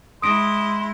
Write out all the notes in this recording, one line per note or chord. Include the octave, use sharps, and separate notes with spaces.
G#3 E4 C6 D#6 D7